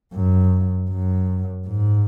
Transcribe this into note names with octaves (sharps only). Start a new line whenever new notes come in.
F#2
F#2
G#2